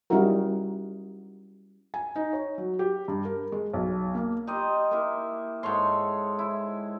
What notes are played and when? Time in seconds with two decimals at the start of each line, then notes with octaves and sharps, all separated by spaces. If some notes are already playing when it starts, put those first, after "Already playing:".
0.10 G3 C#4 D#4 E4 F#4 A#4
1.94 G#5
2.16 D#4
2.33 C#5
2.58 F#3
2.79 G4
3.08 G2
3.25 A#4
3.52 G#3
3.73 B1
4.15 A#3
4.47 D#4 F4 G4 D#5
4.91 A#3 E4
5.63 G#2 A4 C#5 C6
6.39 E4